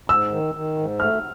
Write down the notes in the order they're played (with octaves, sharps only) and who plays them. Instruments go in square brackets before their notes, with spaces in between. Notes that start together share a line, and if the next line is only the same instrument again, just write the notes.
[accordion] G#2 [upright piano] E6
[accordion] D#3
D#3
G#2
[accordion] A3 [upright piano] F6